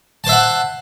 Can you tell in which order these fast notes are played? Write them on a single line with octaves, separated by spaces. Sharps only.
A5 C5 E5 F#5